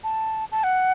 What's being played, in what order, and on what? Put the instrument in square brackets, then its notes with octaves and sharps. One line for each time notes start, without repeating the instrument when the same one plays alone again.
[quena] A5
A5
F#5